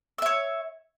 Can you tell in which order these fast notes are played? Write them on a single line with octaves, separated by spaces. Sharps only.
E6 E5 C#5